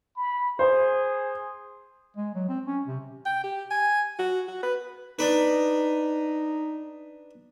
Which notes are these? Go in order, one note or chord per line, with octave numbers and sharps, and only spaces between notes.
B5
G#4 C5
G#3
F#3
C4
C#4
C3
G5
G4
G#5
F#4
F#4
B4
D4 D#4 B4